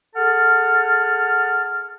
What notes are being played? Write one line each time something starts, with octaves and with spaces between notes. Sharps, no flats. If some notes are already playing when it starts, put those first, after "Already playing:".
G#4 A4 F#5 A5 F6